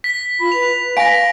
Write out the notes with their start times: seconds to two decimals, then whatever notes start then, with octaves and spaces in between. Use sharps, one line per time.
0.04 B6
0.39 F4 B5
0.52 B4 F7
0.97 F5 G#5 A#6 D7